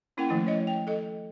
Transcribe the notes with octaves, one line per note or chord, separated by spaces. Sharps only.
A#3 C#4 E4 A#4 F#5 G5
D#3 F3 A3 C#4 E4
C#5 D#5
G5
A4 D#5